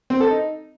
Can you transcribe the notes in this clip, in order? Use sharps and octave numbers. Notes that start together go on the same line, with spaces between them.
C4
A4
D#4